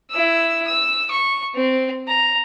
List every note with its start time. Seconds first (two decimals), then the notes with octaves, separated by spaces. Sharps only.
0.10 E4 E6
0.67 E6
1.11 C#6
1.54 C4
2.08 A#5